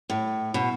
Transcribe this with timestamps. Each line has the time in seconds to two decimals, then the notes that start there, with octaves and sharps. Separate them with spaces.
0.10 A2
0.54 B2